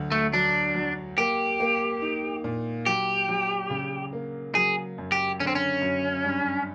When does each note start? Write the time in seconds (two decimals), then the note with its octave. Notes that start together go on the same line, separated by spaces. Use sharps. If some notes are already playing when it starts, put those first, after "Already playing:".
Already playing: D2 F#3
0.12 A3
0.33 F#3 D4
0.75 F#3
1.18 A#3 G4
1.60 A#3
2.02 D#4
2.44 A#2
2.86 F#3 G4
3.28 F#3
3.70 C#3
4.13 A#3
4.55 F#3 G#4
4.98 F#2
5.12 G4
5.40 D3 C#4
5.47 C4
5.55 C#4
5.81 F#2
6.24 G2